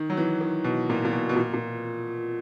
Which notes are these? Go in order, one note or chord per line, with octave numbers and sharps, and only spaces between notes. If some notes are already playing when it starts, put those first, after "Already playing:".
Already playing: D#3
F#3
E3
D#3
B2
A#2
A#2
B2
B2
A#2
A#2